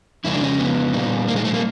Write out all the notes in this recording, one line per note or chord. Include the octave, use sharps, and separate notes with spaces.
F2 C#3 G#3 E4
D4
C#4
B3
A#2 G3
A#3
G#3
A3
A#3